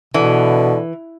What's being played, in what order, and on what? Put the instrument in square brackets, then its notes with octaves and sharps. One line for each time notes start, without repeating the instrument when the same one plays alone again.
[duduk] B2 [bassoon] D3 [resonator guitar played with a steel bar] E3